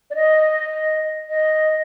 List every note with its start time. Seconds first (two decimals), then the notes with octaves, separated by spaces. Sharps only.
0.10 D5
0.15 D#5
1.29 D#5